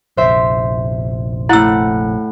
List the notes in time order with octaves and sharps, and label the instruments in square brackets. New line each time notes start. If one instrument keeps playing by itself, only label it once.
[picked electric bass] F1 A#1 [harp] C5 E5
[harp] A2 F#5 [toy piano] E4 E6